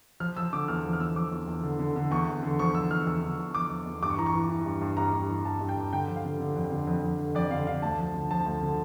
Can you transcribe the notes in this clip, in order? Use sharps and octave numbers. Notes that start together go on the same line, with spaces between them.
F3 F6
F3 E6
D3 D6
E2 F6
F3
F6
E2 E6
F3 D6
E2
E2
D3
D3
D3
E2 C#6
E2
D3
F3 C#6
F3 E6
E2 F6
E2 E6
D3
E2
E2 D6
F3
E2
G2 D6
C#6
E3 A#5
C#6
E3
E3
G2
G2
G2 A#5
G2
E3
G2 A5
G2
G5
G2
D3 G5
F3
F5
D3
D3
F2
D3
F2
F2
D3
F2 D5
D3 F5
D3 F5
D2 A5
F3
D3
F3 A5
D2
D3